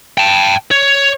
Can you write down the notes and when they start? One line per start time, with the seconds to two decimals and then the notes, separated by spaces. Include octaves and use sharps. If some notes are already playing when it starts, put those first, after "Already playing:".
0.18 G5 A5
0.71 C#5